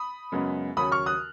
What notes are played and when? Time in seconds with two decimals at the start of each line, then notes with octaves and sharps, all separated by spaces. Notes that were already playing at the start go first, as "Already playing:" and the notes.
Already playing: B5 D#6
0.32 F#2 C#3 G#3 B3
0.77 D#2 C#3 F#3 C#4 B5 D#6
0.92 C#6 F6
1.06 D#6 F#6